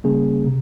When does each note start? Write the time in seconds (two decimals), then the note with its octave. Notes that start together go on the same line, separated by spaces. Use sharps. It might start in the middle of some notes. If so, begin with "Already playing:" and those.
0.04 C#3 G3 A#3 C#4 G#4
0.46 C3